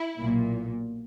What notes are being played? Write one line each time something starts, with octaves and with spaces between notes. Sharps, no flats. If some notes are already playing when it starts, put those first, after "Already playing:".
Already playing: E4
B1 A#2